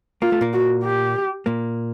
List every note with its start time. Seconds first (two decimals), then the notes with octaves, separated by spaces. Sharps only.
0.22 A#3 F4
0.32 A3
0.41 A#2 A#3
0.53 F#4
0.84 G4
1.46 A#2 A#3